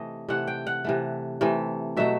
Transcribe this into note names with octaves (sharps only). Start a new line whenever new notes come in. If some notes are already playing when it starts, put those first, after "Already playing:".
Already playing: C3 E3 A3 D#5
C3 E3 A3 F#5
G5
F#5
C3 E3 A3
C3 E3 A3
B2 F#3 A3 E5